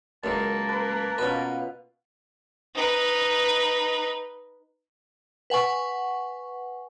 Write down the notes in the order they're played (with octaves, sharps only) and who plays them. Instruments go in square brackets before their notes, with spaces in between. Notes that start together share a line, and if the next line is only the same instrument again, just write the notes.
[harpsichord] C#2 F#2 [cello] A#3 [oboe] A5
[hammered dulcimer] B4 [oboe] A5
[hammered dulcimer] B2 F4 [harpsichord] C#4 B4
[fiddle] D#4 B4
[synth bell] B4 F#5 G#5 C#6